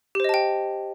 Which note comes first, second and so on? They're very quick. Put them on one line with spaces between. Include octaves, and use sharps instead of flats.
G4 C5 D#5 A5 G5